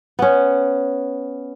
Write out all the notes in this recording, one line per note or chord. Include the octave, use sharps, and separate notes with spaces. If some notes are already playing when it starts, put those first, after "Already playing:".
B3 C#4